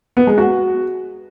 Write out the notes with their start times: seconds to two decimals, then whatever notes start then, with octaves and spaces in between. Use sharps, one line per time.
0.17 B3
0.27 G#3
0.38 F#4